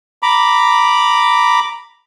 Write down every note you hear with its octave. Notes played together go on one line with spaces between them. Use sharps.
A#5 B5 D6